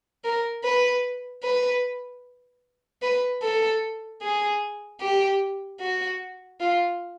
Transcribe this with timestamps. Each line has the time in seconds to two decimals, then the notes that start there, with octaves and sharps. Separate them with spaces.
0.24 A#4
0.64 B4
1.44 B4
3.02 B4
3.42 A4
4.22 G#4
5.01 G4
5.81 F#4
6.60 F4